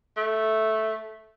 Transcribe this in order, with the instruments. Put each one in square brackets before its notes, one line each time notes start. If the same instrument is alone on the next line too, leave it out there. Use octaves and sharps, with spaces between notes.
[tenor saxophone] A3